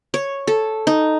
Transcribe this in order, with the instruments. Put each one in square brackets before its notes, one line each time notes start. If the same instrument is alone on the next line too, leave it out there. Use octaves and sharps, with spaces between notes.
[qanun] C#5
A4
D#4